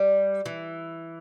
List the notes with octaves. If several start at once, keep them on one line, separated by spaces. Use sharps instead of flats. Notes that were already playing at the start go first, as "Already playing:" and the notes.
Already playing: G3
E3